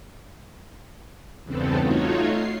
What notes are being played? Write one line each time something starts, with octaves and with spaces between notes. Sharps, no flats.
E2 G2 C#3 B3 C4 A4
A3 D#4 F4 F#4 C#5
C7